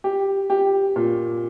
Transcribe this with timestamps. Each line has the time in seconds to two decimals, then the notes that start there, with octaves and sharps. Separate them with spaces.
0.04 G4
0.50 G4
0.96 A#2